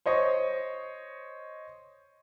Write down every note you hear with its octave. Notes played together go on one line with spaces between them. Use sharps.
C5 C#5 D#5 C#6